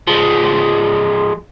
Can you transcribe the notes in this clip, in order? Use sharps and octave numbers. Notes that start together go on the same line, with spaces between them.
F3 G#3